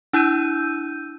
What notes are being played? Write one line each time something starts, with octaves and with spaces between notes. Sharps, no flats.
D4 E4 E6 G6 D#7